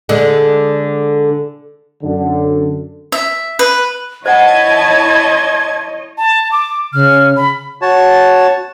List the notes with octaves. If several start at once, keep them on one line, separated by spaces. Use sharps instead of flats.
D3 G#3
F#2 D3
E5
B4
E4 C5 C#5 D#5 F#5 A5 G#6
A5
D6
C#3 F6
B5
F#4 C#5 A5